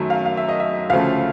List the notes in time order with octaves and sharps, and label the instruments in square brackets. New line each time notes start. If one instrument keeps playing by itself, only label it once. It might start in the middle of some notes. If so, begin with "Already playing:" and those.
Already playing: [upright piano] F#2 D#3 F#3 A3
F5
F5
E5
D#5
E5
D2 C#3 F3 A3 F5